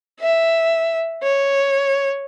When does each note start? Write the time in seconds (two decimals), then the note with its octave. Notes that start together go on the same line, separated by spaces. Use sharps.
0.20 E5
1.23 C#5